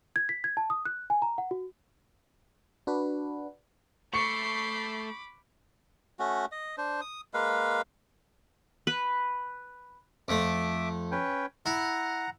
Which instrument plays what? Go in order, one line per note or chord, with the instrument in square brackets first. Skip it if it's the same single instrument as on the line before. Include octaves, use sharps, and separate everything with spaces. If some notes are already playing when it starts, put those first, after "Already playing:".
[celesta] G#6
B6
G#6
A5
D#6
F#6
G#5
A#5
F#5
F#4
[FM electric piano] D4 F#4 B4
[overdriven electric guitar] A3 [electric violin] B5 D6 [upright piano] C#6 C#7 [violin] G6 C7
[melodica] A3 C#4 F#4
D#5
D4 C5
D#6
G#3 A#3 B4 F5
[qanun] B4
[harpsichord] F2 A3 [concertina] E5 D6
[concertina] C#4 B4 G5
[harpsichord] E4 [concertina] F#5 A#5